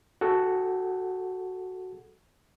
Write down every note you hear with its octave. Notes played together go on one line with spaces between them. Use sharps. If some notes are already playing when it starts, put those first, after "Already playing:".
F#4 G#4 A4 F#5